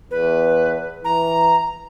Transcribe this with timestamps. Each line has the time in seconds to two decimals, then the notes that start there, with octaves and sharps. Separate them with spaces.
0.11 E2 B4
1.05 E3 A#5